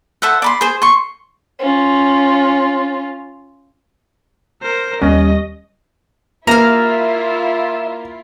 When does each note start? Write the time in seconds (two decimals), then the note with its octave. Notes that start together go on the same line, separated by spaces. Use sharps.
0.22 A4 C5 E5 F#5
0.42 D5 B5 C6
0.61 G#4 C5
0.82 C6 C#6
1.59 C#4 F4
4.62 A#4 C5
5.02 D#2 G3 C#4 D#5
6.47 A#3 E4 F4 E5 F5 A#5